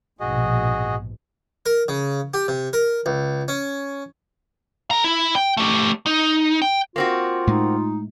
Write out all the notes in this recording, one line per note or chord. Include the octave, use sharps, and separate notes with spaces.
A#1 G#2 B2 F#4 G#4 D#5
A#4
C#3
G4
C3
A#4
C#2
C#4
A4 A#5
E4
G5
A3 G4
D#4
G5
A#3 C4 F4 F#4
A2 G#3 D#4